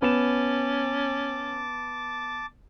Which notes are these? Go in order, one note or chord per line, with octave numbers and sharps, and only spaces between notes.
B3 C#4 A5 D6 E7